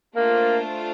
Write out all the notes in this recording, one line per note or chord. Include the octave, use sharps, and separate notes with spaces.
A3 A#3 D4 F4 C5